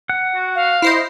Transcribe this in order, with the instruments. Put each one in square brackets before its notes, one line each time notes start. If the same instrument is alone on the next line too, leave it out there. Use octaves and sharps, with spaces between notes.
[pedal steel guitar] F#5
[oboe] F#4
[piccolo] F5
[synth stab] E4 C5 D#5 [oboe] C6